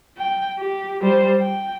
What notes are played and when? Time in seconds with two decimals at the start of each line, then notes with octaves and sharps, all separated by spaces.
0.18 G5
0.58 G4
1.02 G3 C5
1.40 G5